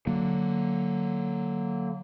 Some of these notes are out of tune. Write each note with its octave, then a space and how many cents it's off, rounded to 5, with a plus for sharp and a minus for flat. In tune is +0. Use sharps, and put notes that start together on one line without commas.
D3 +0 F#3 +0 A#3 -10